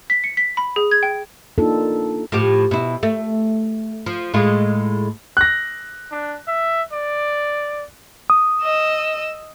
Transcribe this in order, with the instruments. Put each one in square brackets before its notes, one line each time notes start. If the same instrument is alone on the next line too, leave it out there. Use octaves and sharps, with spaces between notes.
[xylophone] B6
C#7
B6
B5
G#4
G#6
G5
[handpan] A#3 D4 D#4 F4 A4
[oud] A2 F3 G4
B2 E4
A3
F3
A2 G#3 F4
[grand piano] F#6 A#6
[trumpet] D4
E5
D5
[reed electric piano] D#6
[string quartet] D#5 E6